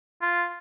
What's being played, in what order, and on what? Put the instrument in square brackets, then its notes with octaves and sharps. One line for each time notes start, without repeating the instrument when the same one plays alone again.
[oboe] F4